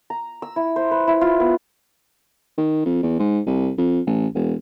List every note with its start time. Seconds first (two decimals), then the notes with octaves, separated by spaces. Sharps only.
0.10 A#5
0.42 E6
0.56 E4
0.76 C5
0.91 B4
1.07 E4
1.21 F4
1.40 B3
2.57 D#3
2.85 F2
3.03 E2
3.19 G#2
3.46 C2
3.78 F2
4.07 A1
4.35 E1